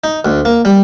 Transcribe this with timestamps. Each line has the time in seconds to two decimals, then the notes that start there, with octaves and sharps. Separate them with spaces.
0.04 D#4
0.25 D2
0.45 A#3
0.65 G3